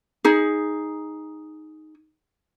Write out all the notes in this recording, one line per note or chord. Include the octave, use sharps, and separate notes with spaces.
D#4 G#4